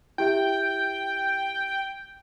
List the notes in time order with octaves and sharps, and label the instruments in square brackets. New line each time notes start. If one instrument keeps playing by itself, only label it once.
[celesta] E4 G4 E5 [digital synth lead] G5